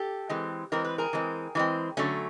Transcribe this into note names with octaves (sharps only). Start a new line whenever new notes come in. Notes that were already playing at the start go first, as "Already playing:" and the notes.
Already playing: G4 A4
E3 G#3 C4
E3 G#3 C4 A#4
B4
G#4 A#4
E3 G#3 C4
E3 G#3 C4
D3 F#3 A3 C#4